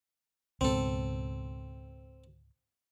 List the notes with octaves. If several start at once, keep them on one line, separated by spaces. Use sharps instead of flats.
C#2 G#2 B2 C4 A4